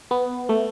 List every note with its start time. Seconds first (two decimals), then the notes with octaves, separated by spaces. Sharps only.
0.11 B3
0.49 A3